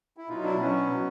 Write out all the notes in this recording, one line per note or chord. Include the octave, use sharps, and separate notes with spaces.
E4
B2 F#3 D#4 F4
D4 E4
B2 F#3 B3 C#4
B2 F#3